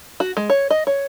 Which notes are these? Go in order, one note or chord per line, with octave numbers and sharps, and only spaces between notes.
F#4
G#3
C#5
D#5
C#5